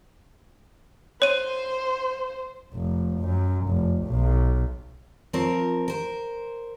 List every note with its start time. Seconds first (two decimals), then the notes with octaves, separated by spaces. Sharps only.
1.22 C5 C#5 D#7
2.74 F1
3.20 F#2
3.67 F1
4.06 B1
5.33 F3 C4 F4 A#4 C#5
5.88 A#4 C5